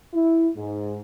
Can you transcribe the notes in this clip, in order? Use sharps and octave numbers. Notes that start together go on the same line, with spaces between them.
E4
G#2